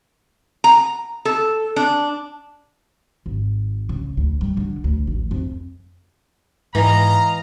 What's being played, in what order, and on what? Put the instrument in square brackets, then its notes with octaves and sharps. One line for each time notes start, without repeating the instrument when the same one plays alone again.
[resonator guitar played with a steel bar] A#5
A4
D4
[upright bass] G#1
C#3
D2
G3
D3
D2
A1
F2
[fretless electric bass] G#2 [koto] E3 [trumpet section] D#5 F5 A#5